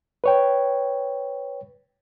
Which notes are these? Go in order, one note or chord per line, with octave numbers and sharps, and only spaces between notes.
B4 C#5 G5